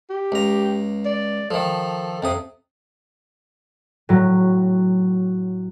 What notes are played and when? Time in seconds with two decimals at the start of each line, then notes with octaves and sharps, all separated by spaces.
0.10 G4
0.32 C#2 A#5
1.05 D5
1.51 D#3 F3 A4
2.22 F2 C3 D#6
4.09 A2 F#3